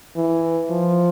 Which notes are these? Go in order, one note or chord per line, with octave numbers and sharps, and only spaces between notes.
E3
F3